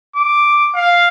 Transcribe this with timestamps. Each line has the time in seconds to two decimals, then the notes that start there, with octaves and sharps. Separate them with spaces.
0.16 D6
0.74 F5